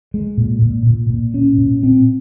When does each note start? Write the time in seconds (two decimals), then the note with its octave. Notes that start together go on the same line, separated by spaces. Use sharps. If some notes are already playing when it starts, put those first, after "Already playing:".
0.14 G#3
0.37 A#2
0.62 A#2
0.87 A#2
1.10 A#2
1.34 C#4
1.58 A#2
1.83 C4